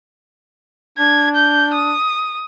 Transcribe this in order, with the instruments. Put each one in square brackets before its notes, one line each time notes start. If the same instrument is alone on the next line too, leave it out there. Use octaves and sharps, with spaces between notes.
[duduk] D4 [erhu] G#6
[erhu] G6
D#6